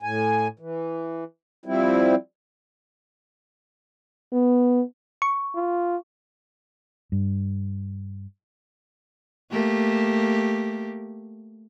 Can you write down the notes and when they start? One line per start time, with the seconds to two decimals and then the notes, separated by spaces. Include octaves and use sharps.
0.03 A2 G#5
0.59 E3
1.66 F3 G3 C4 E4
4.32 B3
5.22 C#6
5.55 F4
7.12 G2
9.52 A3 A#3 G4